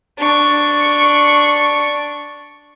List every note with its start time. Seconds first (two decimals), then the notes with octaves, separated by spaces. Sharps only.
0.19 D4 C#6